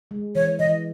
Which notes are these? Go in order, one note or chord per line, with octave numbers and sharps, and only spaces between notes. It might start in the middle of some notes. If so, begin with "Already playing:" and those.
G#3
E3 C#5
E3 D#5